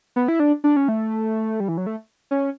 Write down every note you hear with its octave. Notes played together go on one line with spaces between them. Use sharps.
B3
E4
D4
D4
C#4
A3
G3
E3
F#3
A3
C#4